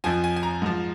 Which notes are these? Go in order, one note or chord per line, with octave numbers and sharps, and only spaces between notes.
F2 F3 G#5
G#5
G#5
A#5
G#2 F3